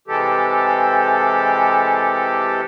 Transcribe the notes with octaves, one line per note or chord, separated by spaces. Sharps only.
C3 E3 G#3 G4 A4